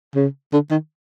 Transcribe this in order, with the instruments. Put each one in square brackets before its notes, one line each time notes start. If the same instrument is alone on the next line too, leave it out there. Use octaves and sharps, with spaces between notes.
[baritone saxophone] C#3
D3
D#3